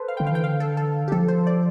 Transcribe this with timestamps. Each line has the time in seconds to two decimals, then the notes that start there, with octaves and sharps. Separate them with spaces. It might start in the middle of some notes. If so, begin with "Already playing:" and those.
Already playing: A4 B4 C5
0.08 F5
0.17 G5
0.20 D3
0.27 F5
0.32 E3 G5
0.43 D3 F5
0.60 A4
0.77 A4
1.08 G4
1.12 F3 A4
1.28 C5
1.47 D5